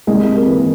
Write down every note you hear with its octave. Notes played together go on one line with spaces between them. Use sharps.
C2 G#3
C3
A#3
E3